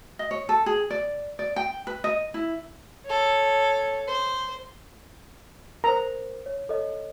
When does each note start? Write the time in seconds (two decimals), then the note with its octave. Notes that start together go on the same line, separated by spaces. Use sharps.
0.19 D#5
0.31 C#5
0.49 A4
0.66 G#4
0.91 D5
1.39 D5
1.56 G5
1.87 B4
2.04 D#5
2.34 E4
3.05 A4 C#5
4.07 C5
5.84 A#4 C5 A#5
6.46 C#5
6.69 A4 C#5 D#5